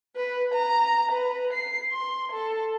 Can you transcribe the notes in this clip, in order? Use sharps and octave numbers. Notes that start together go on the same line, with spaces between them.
B4
A#5
B4
C7
C6
A4